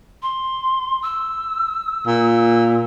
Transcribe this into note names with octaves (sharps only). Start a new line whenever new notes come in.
C6
E6
A#2